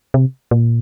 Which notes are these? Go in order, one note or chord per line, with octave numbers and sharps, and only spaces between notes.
C3
A#2